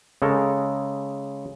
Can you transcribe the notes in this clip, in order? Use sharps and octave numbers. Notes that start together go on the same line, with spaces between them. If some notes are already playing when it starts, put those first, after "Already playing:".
C#3 G#3 A4 A#4